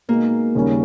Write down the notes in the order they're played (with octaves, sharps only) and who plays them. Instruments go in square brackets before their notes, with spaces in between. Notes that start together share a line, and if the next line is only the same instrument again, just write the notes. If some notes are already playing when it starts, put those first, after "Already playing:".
[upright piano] B2 G#3 D#4 [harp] A#3
[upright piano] D#2 C#3 G3 C#4